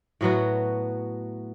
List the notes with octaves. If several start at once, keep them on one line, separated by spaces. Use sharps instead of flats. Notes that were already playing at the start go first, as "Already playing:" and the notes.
A2 F#3 B3 F#4